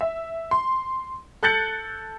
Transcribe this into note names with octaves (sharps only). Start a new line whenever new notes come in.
E5
C6
A4 F#6 G6 A6 C#7 F#7